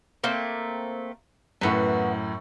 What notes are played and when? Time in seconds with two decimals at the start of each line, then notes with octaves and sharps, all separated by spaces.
0.24 A3 A#3 C4
1.61 F#2 A2 E3 B3